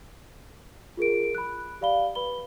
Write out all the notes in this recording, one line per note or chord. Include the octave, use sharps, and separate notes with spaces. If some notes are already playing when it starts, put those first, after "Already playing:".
F4 G#4 A#4 D7
B5 F#6
G4 D5 F5 B5 G7
B4 B5 G7